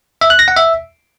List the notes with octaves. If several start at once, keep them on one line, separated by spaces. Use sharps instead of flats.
E5
F#6
A#6
F#5
E5